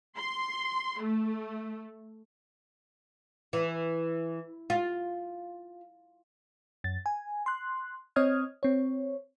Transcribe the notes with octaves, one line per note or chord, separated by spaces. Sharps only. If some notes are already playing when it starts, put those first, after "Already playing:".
C6
A3
E3
F4
F#2 A6
G#5
C6 F#6
C4 C#5 D#5 D#6 F6 G#6
C4 C#5